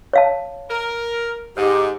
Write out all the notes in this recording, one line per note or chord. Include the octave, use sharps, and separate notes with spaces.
C#5 F5 A5
A#4
G#2 G4